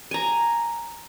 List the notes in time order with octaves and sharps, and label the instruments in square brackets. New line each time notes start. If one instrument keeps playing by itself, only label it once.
[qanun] G#5 A#5